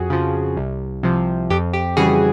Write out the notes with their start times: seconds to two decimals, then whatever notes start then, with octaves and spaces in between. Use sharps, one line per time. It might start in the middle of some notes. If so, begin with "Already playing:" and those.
Already playing: F2 F#4 G#4
0.10 C#3 F3
0.56 C2
1.03 C3 F3
1.50 F2 G4
1.73 G4
1.97 C#3 E3 G3 F#4 G#4